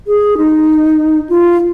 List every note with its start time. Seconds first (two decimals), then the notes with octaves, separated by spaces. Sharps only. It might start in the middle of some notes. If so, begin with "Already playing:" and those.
0.07 G#4
0.38 D#4
1.29 F4